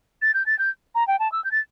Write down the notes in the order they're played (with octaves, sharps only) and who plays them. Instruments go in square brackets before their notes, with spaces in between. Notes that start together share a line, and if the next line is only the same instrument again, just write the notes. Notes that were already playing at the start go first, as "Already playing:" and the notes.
[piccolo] A6
G6
A6
G6
A#5
G5
A5
E6
G6
A6